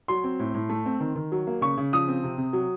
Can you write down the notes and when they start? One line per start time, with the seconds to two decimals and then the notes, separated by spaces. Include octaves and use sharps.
0.08 F#3 C6
0.24 C4
0.39 A2
0.54 A2
0.69 A3
0.86 C4
1.00 D#3
1.15 D#3
1.32 F#3
1.47 A#3
1.61 C#3 C#6
1.77 C#3
1.93 F3 D#6
2.08 C4
2.24 C3
2.38 C3
2.53 F#3